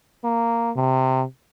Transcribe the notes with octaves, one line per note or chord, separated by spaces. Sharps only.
A#3
C3